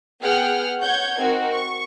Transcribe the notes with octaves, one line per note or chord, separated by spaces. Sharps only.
B3 G#4 F#5 G5 F6
C#5 F#5 G6 G#6
C4 D#4 F#4 A#4
C#6